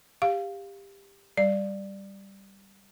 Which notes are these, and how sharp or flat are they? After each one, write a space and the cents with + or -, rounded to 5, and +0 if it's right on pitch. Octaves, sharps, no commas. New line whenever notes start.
G4 +20 F5 +0
G3 +0 D5 +10